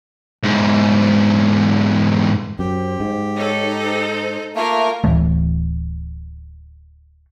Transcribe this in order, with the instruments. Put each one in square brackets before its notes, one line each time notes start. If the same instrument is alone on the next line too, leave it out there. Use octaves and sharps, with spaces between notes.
[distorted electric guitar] E2 G#2
[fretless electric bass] F#2 [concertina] G4 [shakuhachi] C5
[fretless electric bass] G#2
[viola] D#4 A4 [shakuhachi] C#5
[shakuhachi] C5
[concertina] A3 A#3 [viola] F4 A#4 [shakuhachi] E5
[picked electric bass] D1 E3 A3